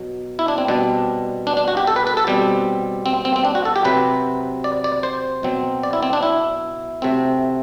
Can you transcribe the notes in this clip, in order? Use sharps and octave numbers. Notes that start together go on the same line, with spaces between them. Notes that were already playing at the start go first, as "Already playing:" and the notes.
Already playing: B2 F#3
E4
D4
C4
B2 G3 C4 D4
D4
D4
F#4
G4
A4
B4
B4
A4
B2 G3 C4 G4
C4
C4
C4
D4
F#4
A4
G4
C3 F#3 C4 B4
D5
D5
C5
B2 F#3 C4
D5
E4
C4
D4
E4
C3 F#3 A3 C4